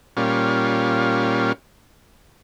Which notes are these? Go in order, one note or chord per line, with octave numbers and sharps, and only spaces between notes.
A#2 G3 C#4 F4